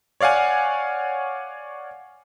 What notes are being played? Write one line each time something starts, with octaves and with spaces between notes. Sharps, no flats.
C#5 D5 F5 F#5 G#5